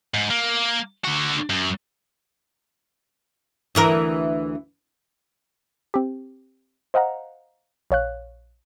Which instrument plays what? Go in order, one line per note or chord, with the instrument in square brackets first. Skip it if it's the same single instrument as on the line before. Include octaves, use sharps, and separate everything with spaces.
[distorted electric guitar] G#2
A#3
D3 F#4
F#2
[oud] D2 E3 A#4
[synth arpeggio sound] C4 G4
C5 D#5 F5 F#5 A#5
A#1 C#5 F5 F#6